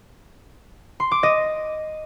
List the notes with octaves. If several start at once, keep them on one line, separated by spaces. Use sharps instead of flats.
C6
D6
D#5